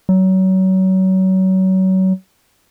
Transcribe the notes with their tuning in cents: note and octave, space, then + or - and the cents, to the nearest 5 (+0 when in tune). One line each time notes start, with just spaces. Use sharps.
F#3 +30